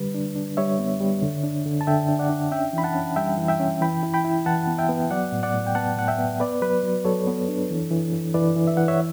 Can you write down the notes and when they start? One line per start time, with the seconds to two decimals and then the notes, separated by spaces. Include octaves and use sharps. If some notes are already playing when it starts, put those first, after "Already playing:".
Already playing: D3 G3 B4
0.14 D4
0.36 D4
0.57 G3 C#5 E5
0.79 B3
1.01 G3
1.22 D3
1.44 D4
1.66 D3
1.81 A5
1.87 D3 E5 G5
2.09 D4
2.19 D5 F#5
2.30 D4
2.51 C#4 E5 G5
2.73 E3 B5
2.84 F#5 A5
2.95 C#4
3.16 G3 E5 G5
3.38 E3
3.48 E5 G5
3.60 C#4
3.81 E3 G5 B5
4.03 E4
4.14 G5 B5
4.25 E4
4.46 E3 F#5 A5
4.67 B3
4.78 E5 G5
4.89 B3
5.10 F#3 D5 F#5
5.32 A2
5.43 D5 F#5
5.54 A2
5.67 G5
5.75 B3 F#5 A5
5.97 A2 F#5
6.08 E5 G5
6.18 B3
6.40 B3 B4 D5
6.62 F#3 B4
6.84 F#3
7.05 F#3 A4 C#5
7.27 B3
7.49 D4
7.70 E3
7.91 E3
8.13 E3
8.34 E3 B4 D5
8.56 E3
8.67 E5
8.77 E3 F#5
8.88 C#5 E5